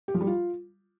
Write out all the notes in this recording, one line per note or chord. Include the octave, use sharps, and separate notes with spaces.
G4
F3
G3
F4